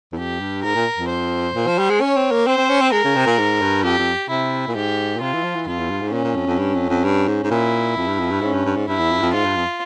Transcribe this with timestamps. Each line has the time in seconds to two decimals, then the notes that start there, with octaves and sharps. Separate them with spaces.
0.13 E2
0.18 F2 G4
0.40 G2
0.64 G#2 A#4
0.75 A#2
0.98 F2
1.10 C5
1.55 A#2
1.67 F3
1.79 G3
1.90 G#3
2.01 C#4 C#5
2.16 C4
2.31 A#3
2.47 C4 C5
2.58 C4
2.69 C#4
2.81 C4
2.92 G#3 A#4
3.04 C#3
3.16 C3
3.26 A#2
3.39 G#2
3.62 G2
3.84 F2 G4
3.99 F2
4.30 C3 E4
4.67 A#2
4.75 G#2 G4
5.16 A#2
5.21 C3 F4
5.33 E3
5.44 F3
5.56 E3
5.67 F2 F4
5.79 E2
5.90 G2
6.01 G#2
6.13 A#2 C#4
6.24 A#2
6.35 F2
6.47 F2
6.59 G2
6.75 F2
6.89 F2
7.04 G2
7.28 G#2
7.44 G#2
7.51 A#2 E4
7.97 F2
8.08 G2
8.19 F2
8.31 G2
8.41 G#2 C#4
8.53 G2
8.65 G2
8.76 G#2
8.88 G2 E4
8.99 E2
9.11 F2
9.18 G2
9.22 F2
9.34 G#2 F4
9.45 G2
9.56 F2